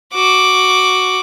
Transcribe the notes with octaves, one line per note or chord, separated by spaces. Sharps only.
F#4 D6